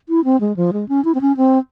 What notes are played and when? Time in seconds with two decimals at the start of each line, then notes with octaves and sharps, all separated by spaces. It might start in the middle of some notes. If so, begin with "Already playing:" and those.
0.09 E4
0.24 C4
0.41 G#3
0.56 F3
0.73 G#3
0.89 C#4
1.05 E4
1.15 C4
1.21 C#4
1.37 C4